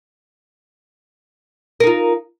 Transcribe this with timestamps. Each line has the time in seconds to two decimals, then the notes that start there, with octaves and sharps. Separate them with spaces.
1.80 A#4
1.84 D#4
1.87 F4